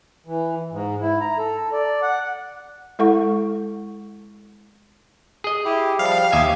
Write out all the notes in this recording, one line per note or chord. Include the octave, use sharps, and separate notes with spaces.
E3
G#2
E4
A#5
A4
D5
F#5
G#3 E4 A4 F#5 C#6
G#4 D#5
E4 G4
F3 G3 F5
D#2 G4 D#5 E5 G#5